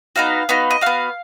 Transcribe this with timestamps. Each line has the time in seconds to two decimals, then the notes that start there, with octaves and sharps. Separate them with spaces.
0.16 B3 D#4 F#4 F5
0.49 B3 D#4 F#4
0.71 D#5
0.81 B3 F#4 F5